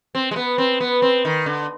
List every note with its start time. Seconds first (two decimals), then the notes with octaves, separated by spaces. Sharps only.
0.15 C4
0.31 G#3
0.36 B3
0.58 C4
0.80 B3
1.02 C4
1.25 D#3
1.46 D3